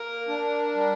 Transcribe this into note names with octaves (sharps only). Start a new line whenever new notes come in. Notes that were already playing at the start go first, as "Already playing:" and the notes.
Already playing: A#3 A#4
D4
G3